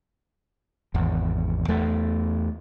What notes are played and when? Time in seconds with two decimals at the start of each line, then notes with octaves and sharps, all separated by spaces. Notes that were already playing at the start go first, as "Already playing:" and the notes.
0.94 G#1 E2
1.68 E2 A3